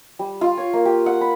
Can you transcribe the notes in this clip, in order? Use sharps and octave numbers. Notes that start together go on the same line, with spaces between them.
G3
F4
C#5
A#3
G4
F#5
B5